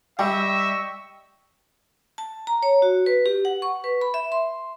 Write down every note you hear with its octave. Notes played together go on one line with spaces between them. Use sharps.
G3 D#5 E5 G5 C#6
A5
A#5
C#5
F#4
B4
G4
F#5
C#6
B4
B5
E5
C6